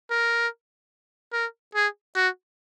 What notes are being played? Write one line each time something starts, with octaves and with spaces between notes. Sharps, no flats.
A#4
A#4
G#4
F#4